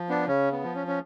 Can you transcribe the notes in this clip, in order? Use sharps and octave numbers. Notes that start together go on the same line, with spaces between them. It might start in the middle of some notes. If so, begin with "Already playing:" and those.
Already playing: F3
B3 D4
C#3 C#4
B3
F3
C#4
C#4